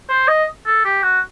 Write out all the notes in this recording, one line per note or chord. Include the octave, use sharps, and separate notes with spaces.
C5
D#5
A4
G4
F#4